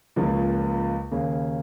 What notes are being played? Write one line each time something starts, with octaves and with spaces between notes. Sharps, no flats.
C#2 C#3 F3 A#3
D#2 C#3 A#3